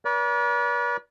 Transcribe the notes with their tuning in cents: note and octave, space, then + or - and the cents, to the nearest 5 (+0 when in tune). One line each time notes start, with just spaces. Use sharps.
B4 -45 D5 -35